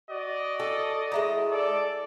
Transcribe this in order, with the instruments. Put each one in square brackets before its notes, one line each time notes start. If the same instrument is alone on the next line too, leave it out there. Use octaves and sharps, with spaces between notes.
[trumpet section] F#4 D5 D#5
[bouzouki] A4
G#3 E4 A#5
[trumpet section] A4 D5